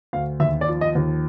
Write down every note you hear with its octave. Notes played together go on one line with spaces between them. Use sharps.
D2 F5
D#2 E5
D5
F3
D#5
D#2